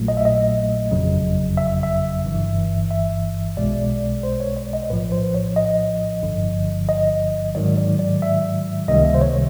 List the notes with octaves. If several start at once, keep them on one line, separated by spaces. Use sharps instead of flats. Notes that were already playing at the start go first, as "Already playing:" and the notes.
Already playing: A#1 A#2 F#3 A3
D#5
E5
D#5
G1 F2 C#3 F#3
E5
E5
G1 G2 E3
E5
B1 B2 G#3 D5
C5
C#5
D5
D#5
A#1 A2 F3 B4
C5
C#5
D#5
G1 G2 D3 F3
D#5
G#2 D#3 F#3 D5
D5
D5
E5
C#2 C3 D#3 G3 A#3 D#5
E5
C5
C#5